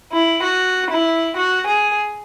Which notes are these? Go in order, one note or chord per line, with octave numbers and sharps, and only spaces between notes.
E4
F#4
E4
F#4
G#4